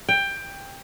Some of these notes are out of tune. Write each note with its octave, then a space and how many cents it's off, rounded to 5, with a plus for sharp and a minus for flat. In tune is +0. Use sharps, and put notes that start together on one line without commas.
G5 +15